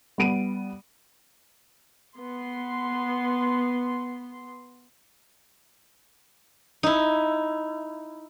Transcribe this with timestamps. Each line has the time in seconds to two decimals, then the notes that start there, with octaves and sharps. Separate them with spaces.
0.18 G3 B3 D7 D#7
2.15 B3 C6
6.83 D#4 E4